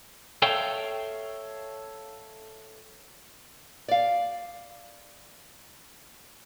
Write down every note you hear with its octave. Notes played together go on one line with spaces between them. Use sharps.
A4 C#5 E5 F5 G5
D5 F5